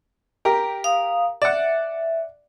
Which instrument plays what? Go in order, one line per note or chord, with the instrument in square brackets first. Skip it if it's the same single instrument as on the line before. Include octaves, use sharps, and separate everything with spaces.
[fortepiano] G4 A#4
[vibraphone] F5 D#6
[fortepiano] D5 F#5 [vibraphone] E5